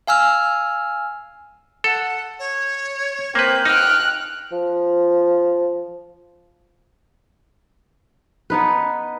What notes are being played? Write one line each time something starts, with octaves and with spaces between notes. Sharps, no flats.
F5 G#5 E6 F6
A4 F#5
C#5
A#3 C4 B4 G6
D#4 G5 F6 F#6
F3
B3 D#4 B4